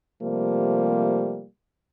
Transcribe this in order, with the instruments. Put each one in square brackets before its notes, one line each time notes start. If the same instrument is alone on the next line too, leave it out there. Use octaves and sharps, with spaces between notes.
[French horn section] C3 F3 G3 A3 A#3